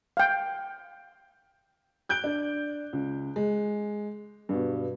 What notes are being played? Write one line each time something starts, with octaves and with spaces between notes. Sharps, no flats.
F5 G5
F#6 G6 D7 G7
D4
C#2
G#3
G2 B2